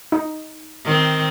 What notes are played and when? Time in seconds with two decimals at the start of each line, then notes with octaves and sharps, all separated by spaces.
0.12 D#4
0.85 D#3 C4